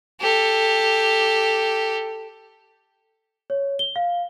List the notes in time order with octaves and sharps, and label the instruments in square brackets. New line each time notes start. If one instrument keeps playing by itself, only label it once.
[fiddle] G4 A4
[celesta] C#5
G7
F5